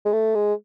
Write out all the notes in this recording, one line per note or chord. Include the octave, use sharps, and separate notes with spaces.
G#3
A3
G#3